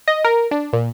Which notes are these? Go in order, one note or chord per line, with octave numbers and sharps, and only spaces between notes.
D#5
A#4
D4
A#2